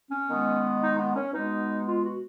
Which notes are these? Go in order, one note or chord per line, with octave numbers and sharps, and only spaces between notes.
C#4
D#3 G#3 B3
D#4
B3
C#4
B2 G#3 B3 D#4
F4
F#4